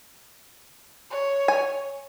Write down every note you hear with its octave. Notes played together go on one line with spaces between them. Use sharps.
C#5
G#5